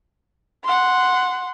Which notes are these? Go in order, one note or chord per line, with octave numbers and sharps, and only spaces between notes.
F#5 C6